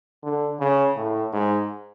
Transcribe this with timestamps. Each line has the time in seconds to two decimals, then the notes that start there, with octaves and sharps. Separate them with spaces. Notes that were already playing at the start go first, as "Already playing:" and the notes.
0.23 D3
0.60 C#3
0.96 A2
1.33 G#2